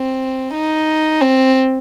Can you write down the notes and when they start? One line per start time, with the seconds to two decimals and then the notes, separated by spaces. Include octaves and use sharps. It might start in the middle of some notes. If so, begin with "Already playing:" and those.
Already playing: C4
0.54 D#4
1.21 C4